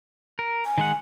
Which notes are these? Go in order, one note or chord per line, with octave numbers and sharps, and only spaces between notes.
A#4
G#5
D#3 G#3 F#5